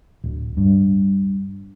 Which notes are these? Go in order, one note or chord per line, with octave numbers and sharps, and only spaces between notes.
D1
G2